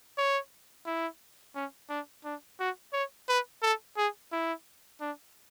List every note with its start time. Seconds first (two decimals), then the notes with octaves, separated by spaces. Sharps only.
0.18 C#5
0.86 E4
1.55 C#4
1.90 D4
2.25 D4
2.60 F#4
2.93 C#5
3.29 B4
3.62 A4
3.97 G#4
4.32 E4
5.01 D4